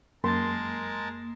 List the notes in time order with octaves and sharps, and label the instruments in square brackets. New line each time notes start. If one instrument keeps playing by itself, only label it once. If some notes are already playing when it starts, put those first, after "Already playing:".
[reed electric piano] F#2 A6 [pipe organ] G#3 A#4 A5 [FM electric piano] A#3 [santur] C6